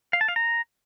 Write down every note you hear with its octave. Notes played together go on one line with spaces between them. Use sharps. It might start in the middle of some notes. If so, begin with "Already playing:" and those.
F5
A5
F5
A#5